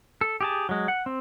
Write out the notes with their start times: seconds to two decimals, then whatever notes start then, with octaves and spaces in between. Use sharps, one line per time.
0.21 A4
0.41 G4 G#4 A5
0.69 F#3 G#3
0.88 F#5
1.06 C4